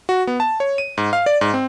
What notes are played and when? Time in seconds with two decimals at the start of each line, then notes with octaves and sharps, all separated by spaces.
0.09 F#4
0.27 B3
0.40 A5
0.60 C#5
0.78 D#7
0.98 G#2
1.13 F5
1.26 D5
1.41 G#2
1.54 C4